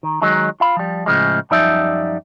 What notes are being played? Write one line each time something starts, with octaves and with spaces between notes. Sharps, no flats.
D#3
D#3 F#3 G#3 D#4
F4 F5 B5
F3 G3
A2 C#3 F3 G#3
F#2 F3 G3 D#4 D5 E5